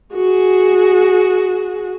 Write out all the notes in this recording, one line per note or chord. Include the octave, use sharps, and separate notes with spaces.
F#4 G#4